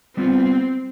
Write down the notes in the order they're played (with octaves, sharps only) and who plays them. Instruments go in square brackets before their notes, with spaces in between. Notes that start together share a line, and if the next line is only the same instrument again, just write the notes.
[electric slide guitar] G3 B3 F4 [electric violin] C4